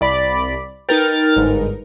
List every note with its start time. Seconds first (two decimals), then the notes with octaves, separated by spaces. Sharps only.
0.01 C2 D5 B5
0.89 D#4 A#4 B4 G5 F6 A6
1.36 G1 G#2